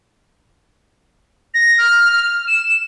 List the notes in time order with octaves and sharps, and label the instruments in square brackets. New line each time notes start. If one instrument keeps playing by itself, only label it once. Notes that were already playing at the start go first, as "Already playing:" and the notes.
[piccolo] A#6
F6
F6
E7